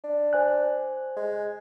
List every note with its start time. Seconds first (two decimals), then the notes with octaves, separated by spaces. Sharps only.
0.04 D4
0.33 C5 G#5 F#6
1.16 G#3